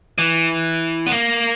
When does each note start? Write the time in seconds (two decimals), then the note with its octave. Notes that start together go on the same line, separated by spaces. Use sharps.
0.18 E3
1.07 B3
1.12 A#3